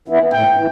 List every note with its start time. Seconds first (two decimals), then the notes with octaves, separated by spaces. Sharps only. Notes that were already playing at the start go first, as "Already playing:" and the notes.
0.08 E3 B3 E4
0.33 A2 G5
0.57 E3